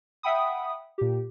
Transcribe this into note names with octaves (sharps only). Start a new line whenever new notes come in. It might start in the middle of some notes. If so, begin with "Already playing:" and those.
E5 F#5 G5 B5 D#6
A#2 G4